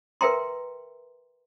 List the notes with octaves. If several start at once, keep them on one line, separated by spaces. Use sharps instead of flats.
A#4 B4 E5 G5 A#5 C6